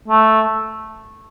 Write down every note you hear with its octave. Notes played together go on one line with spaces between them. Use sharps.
A3